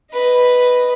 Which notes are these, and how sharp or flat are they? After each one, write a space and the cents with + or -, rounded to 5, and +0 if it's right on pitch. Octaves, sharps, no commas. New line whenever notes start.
B4 +0 D#5 +0